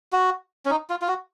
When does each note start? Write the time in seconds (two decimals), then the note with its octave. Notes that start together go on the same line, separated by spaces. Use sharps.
0.13 F#4
0.66 C#4
0.70 D#4
0.90 F4
1.02 F4
1.08 F#4